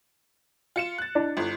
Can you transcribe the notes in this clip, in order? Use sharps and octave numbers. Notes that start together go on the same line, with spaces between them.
F4 C#7 E7
F#6 A6
D4 E4 D#5 B5
G1 F4 A4